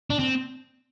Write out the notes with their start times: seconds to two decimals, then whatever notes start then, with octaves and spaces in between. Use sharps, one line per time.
0.10 D4
0.19 C4